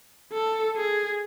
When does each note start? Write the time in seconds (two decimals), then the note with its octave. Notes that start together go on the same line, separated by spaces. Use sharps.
0.33 A4
0.76 G#4